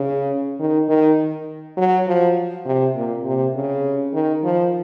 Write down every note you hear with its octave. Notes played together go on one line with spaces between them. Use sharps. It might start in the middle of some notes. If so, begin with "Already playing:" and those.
Already playing: C#3
D#3
D#3
F#3
F3
C3
A#2
C3
C#3
D#3
F3